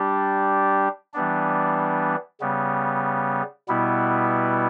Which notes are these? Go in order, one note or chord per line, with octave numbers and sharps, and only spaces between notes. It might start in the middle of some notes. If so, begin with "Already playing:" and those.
Already playing: G3 D4 G4
E3 G3 B3 D4
C#3 G3 B3
B2 G3 B3 E4